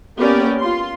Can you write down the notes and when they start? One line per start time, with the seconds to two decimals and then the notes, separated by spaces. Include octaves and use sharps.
0.18 A#3 B3 C#4 G4 A#4 D5
0.59 F4 C6